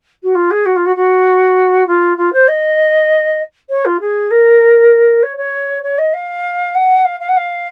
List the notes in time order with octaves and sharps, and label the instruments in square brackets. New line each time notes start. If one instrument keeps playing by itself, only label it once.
[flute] F#4
F4
G#4
F#4
F4
F#4
F#4
F4
F4
C5
D#5
C#5
F4
G#4
A#4
C#5
C#5
C#5
D#5
F5
F#5
F5
F5
F#5
F5